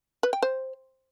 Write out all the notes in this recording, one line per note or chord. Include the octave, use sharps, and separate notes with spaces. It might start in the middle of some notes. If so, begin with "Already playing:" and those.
B4
G5
C5